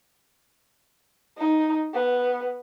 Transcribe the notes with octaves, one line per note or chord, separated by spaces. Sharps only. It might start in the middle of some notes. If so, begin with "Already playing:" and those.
D#4
B3